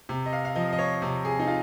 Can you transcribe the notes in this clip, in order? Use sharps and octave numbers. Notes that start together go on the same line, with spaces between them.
C3
D#5
F5
F5
F3 D#5
D#5
C#5
C3
G#4
D#4
F4